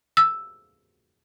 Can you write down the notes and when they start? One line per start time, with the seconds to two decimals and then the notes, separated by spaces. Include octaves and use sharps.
0.17 E6